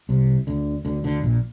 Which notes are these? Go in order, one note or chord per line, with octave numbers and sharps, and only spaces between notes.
C2 C3
D2 D3
D2 D3
D2 D3
A#1 A#2